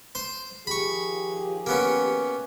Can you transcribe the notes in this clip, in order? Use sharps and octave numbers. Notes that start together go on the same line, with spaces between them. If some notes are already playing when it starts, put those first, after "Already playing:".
C5 C6
D#3 F3 G4 G#4 B5 C#6
A#3 B3 C#4